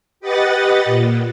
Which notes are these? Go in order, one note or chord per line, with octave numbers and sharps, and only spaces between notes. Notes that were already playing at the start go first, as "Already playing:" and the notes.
G4 B4 D#5 F#5 A6
A#2